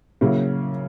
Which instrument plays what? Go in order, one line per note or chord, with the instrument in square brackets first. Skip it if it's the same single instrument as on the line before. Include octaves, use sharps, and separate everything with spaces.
[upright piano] C#3 F#3 A#3 E4